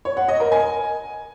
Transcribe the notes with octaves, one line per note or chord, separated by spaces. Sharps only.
C#5
F#5
D#5
A#4
G#5